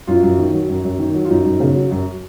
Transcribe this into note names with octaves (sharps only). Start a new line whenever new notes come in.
F#2 F4
F#2
D#3
F#3
F#2
F#2
D#3
F#3
F4
F#2 D#4
F#2
C#3
F#3
F#2